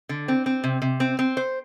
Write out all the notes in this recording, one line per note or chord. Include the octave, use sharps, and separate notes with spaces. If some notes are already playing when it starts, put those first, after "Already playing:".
D3
C4
C4
C3
C3
C4
C4
C5